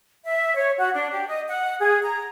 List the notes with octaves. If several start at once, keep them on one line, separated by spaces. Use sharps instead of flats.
E5
C#5
F#4
D4
G4
D#5
F#5
G#4
A#5